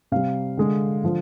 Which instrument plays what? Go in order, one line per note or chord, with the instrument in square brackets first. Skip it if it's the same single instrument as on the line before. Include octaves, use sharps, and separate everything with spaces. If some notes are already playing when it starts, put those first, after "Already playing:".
[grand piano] C3 G3 F5
D3 G#3
D3 F3